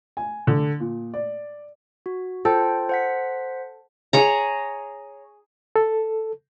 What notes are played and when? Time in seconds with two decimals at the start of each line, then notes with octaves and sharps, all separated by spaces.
0.17 G#5
0.47 D3
0.80 A#2
1.14 D5
2.06 F#4
2.45 F4 A4 C5 G5
2.89 C5 F#5 B6
4.13 G#4 C#5 A#5
5.76 A4